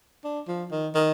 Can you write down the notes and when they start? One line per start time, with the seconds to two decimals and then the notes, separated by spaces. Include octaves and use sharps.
0.24 D4
0.48 F3
0.71 D#3
0.95 D#3